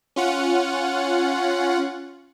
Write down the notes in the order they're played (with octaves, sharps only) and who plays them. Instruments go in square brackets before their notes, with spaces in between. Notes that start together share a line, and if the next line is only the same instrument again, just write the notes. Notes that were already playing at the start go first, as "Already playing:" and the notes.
[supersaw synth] C#4 F4 F#5